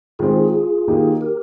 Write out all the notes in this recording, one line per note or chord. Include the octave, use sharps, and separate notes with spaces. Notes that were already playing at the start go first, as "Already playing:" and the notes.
D#3 G#3 C4 F4 G#4
D#3 A#3 D#4 G4
G4 A#4